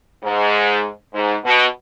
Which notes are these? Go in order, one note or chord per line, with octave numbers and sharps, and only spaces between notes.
G#2
G#2
B2